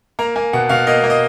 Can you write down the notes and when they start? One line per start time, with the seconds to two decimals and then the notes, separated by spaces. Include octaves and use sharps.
0.19 A#3 A#5
0.36 A#3 G#5
0.53 B2 F#5
0.69 B2 F5
0.87 A#3 D#5
1.04 A#3
1.10 D#5